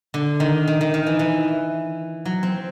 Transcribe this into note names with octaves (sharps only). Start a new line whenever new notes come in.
D3
D#3
D#3
D#3
D#3
E3
E3
F#3
C4